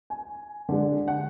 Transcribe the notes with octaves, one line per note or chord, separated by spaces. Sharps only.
G#5
D3 G#3 D4
F#5